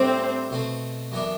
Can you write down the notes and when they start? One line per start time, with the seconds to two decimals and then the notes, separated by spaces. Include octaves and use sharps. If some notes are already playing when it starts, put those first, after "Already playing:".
Already playing: A2 G3 C4 D4 F#4 A4
0.51 B2 A3 C4
1.12 F#2 E3 B3 D4